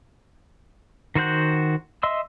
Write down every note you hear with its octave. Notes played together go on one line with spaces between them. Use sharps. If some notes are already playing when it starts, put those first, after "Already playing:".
D#3 F#4 C5 F#5 G6
D#5 E5 C6 E6